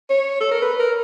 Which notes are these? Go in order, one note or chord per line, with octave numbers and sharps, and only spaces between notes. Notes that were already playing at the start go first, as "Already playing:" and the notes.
C#5
A4
A#4
B4
A#4